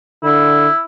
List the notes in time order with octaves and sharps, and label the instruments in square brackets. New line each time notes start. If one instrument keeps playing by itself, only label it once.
[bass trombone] D3 [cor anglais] E4